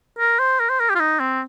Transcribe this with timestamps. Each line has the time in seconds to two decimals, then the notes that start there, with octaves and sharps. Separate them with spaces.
0.19 A#4
0.39 C5
0.59 A#4
0.69 C5
0.80 A#4
0.90 G4
0.95 F4
0.99 D#4
1.20 C4